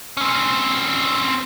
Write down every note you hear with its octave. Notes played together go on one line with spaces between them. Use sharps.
C4 C#4